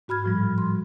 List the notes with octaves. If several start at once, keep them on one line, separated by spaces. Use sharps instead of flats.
G#2 F#4 B5 F6 G#6
A2 F3 G3
C6